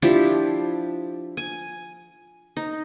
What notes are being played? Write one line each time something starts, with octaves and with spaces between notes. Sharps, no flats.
F3 D4 E4 G4
G#5
D#4